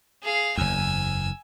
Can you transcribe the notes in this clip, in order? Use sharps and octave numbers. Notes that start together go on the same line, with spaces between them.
G#4 F5
F#1 E2 G#5 E6